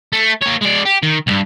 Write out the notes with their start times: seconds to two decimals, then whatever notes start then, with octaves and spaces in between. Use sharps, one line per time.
0.13 A3
0.41 A#3 C#5
0.61 G#3 D5
0.85 G4
1.03 D#3
1.27 C2 G2